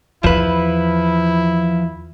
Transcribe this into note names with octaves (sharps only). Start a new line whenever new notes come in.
E2 F3 E4 B4